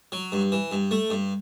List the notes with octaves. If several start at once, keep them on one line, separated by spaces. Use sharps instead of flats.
F#3
G2
E3
G2
A3
G2